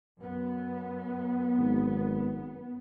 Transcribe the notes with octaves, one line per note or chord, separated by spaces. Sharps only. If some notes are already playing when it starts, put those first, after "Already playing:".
F#2 B3
G#1